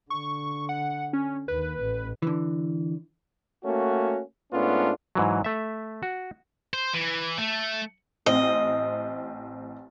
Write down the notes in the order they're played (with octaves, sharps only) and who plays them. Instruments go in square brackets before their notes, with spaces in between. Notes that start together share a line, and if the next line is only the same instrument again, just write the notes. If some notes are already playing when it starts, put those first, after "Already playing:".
[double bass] D3 [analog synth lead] C#6
[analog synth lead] F#5
C#4
[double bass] D#2 [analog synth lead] B4
[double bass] A1
[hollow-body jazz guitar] D3 E3
[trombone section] A3 A#3 C#4 F#4
G#2 A3 B3 C#4 D4 F4
[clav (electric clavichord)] G#2 E3 F#3
A3 E5
F#4
[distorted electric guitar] C5
E3
A3
[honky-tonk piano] A1 C4 [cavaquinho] D#5